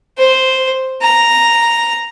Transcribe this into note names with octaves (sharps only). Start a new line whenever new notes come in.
C5
A#5